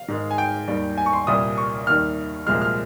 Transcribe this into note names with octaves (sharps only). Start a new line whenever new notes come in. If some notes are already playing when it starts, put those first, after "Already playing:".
Already playing: F5
G#2 D#3 G#3
G#5
G5
D#2 D#3 G3
G#5
C#6
C6
C2 A#2 G3 D#6
C#6
D#2 D#3 G3 F6
C2 A#2 F3 G#3 F6
F6